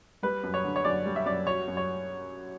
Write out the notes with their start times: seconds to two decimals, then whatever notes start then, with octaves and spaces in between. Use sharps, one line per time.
0.23 G3 B4
0.43 F#2
0.54 C#5
0.64 D3
0.76 C#5
0.85 F#2 D5
1.05 G3
1.16 E5
1.25 F#2 D5
1.47 F#3 C#5
1.68 F#2
1.77 C#5